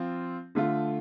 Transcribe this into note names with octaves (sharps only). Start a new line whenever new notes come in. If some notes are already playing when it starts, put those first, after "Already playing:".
Already playing: F3 C4 F4
D3 A3 F4